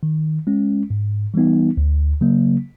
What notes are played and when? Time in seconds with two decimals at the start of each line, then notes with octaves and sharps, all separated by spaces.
0.03 D#3
0.47 G#3 C#4
0.90 G#2
1.34 E3 G3 B3 D#4
1.77 D2
2.21 C#3 F#3 A#3